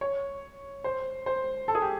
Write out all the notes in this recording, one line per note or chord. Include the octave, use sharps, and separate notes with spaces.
C#5
C5
C5
A4
G#4
G4